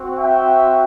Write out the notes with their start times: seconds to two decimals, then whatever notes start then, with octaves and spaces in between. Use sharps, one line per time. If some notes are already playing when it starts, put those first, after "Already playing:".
Already playing: C4 F#4
0.18 E5 G5